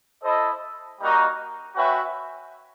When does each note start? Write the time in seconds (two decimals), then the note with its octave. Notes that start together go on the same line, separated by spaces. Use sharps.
0.23 E4 A4 C5 D#5
0.99 G3 A#3 D#4 F#4
1.75 C#4 F#4 B4 E5 G5